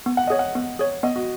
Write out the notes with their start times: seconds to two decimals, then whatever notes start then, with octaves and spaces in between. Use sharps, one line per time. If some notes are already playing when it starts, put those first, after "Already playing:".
0.06 B3
0.17 F#5
0.27 G#4 C#5 D#5
0.39 F#5
0.55 B3
0.79 G#4 C#5
1.03 B3 D#5
1.16 F#4